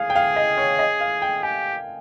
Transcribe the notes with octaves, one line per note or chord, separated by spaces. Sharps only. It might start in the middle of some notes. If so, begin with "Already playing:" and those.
Already playing: G#4 F5
G5
F5
D#5
C#5
D#5
F5
G5
G4 G#5